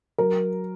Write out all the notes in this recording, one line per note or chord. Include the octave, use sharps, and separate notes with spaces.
F#3 A#4